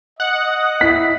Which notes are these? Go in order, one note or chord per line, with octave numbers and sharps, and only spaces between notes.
D#5 F#5
E4 B6